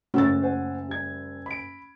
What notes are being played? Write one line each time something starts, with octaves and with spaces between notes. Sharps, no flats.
F#1 A3 C#4 F#4 E6 A6
C5 F#5 G#5
G3 G#6
B5 D7